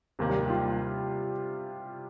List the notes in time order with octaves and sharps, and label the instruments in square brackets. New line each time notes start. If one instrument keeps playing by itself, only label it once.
[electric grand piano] D#2 D#3 A#3 [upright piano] C3
[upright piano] G3
G3
G4
F4